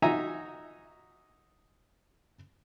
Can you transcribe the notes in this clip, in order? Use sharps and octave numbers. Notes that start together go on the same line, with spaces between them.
D#4 F#4 E5 G#5 A#5